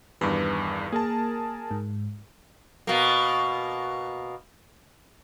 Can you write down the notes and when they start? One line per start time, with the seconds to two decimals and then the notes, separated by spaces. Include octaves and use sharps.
0.21 E2 G2 D#3 B4 D6
0.92 A#3 G#4 A#4 A5
1.71 G#2
2.87 B2 A#3